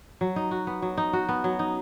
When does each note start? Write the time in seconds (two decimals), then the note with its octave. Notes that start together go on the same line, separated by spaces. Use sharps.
0.21 F#3
0.36 D#4
0.51 F#4
0.67 B3
0.82 F#3
0.97 D#4
1.13 F#4
1.29 B3
1.44 F#3
1.59 D#4